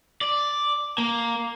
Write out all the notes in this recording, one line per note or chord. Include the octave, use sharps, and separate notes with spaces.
D5
A#3